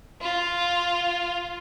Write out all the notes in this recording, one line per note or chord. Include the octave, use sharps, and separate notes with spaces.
F4